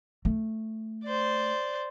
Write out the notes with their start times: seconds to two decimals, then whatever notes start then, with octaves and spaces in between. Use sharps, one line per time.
0.25 A3
1.04 C5 D5